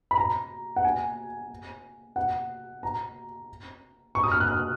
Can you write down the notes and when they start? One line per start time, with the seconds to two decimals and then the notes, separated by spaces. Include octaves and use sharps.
0.11 B5
0.18 A#5
0.76 F#5
0.85 G#5
2.16 F#5
2.83 A#5
4.15 C#6
4.23 D#6
4.32 F6
4.40 F#6
4.48 F6